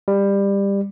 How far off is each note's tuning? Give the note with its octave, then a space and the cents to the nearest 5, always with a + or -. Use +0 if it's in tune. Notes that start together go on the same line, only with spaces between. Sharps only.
G3 +20